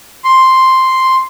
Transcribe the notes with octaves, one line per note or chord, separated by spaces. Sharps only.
C6